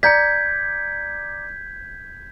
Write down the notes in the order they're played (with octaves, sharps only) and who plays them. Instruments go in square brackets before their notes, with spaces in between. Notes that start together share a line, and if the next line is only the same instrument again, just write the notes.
[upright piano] D5 A#5 C#7 [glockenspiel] G6 G#6 B6